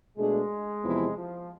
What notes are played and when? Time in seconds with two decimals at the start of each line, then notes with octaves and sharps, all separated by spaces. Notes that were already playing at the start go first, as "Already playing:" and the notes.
0.18 B2 G#3 A3 D4 G#4
0.83 E2 C3 F3 B3 E4
1.16 F3